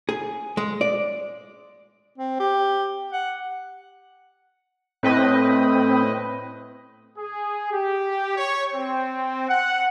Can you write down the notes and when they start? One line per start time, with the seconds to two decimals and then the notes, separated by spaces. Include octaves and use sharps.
0.09 G#4
0.57 G#3
0.81 D5
2.18 C4
2.40 G4
3.13 F#5
5.03 A2 C4 B4 D#5
7.18 G#4
7.72 G4
8.37 C#5
8.75 C4
9.49 F#5